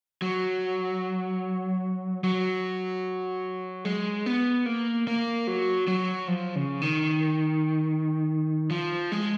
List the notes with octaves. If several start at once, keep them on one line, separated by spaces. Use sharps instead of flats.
F#3
F#3
G#3
B3
A#3
A#3
F#3
F#3
F3
C#3
D#3
F3
G#3